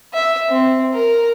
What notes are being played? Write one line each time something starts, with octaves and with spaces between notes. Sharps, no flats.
E5
C4
A#4